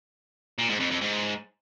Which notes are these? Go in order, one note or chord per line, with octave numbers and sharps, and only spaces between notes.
A#2
G#2
F2
F2
G#2